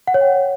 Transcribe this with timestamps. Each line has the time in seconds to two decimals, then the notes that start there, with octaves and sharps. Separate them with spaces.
0.07 F#5
0.14 C#5
0.21 G5